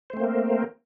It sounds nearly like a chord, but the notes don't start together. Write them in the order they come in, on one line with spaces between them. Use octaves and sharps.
C5 A3 C4 A#3 A#4